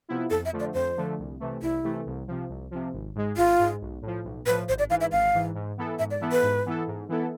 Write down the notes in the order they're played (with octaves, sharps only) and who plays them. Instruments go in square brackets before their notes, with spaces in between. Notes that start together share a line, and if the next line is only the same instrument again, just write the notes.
[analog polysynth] C3 F3 B3 E4
[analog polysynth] F2 [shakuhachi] A4
[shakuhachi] E5
[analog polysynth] D3 F3 A3
[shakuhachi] D5
[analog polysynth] F2 [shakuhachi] C5
[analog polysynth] D3 F3 A3
C2
C3 E3 A3
[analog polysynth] C2 [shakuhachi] E4
[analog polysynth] C3 E3 A3
C2
C3 F3
C2
C3 F3
G#1
G#2 G#3
[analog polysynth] G#1 [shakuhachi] F4
[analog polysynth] G#2 G#3
B1
A2 F3
B1
[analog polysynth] A2 [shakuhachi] B4
[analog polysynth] F3
[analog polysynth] G#1 [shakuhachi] C5
[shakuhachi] D5
[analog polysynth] G#2 E3 [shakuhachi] F5
[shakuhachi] E5
[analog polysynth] G#1 [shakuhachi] F5
[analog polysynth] G#2 E3
G#2
E3 B3 E4 A4
[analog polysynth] G#2 [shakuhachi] E5
[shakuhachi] D5
[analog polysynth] E3 B3 E4 A4
[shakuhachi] B4
[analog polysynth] G#2
E3 B3 E4 A4
G#2
E3 B3 E4 A4